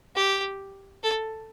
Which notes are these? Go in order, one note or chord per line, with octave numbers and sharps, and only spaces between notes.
G4
A4